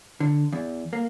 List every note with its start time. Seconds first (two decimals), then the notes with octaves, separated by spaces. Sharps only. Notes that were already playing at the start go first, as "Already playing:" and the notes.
0.20 D3
0.52 E2
0.93 A#3